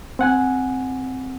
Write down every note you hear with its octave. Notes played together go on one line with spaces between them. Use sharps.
C4 F#5 G#5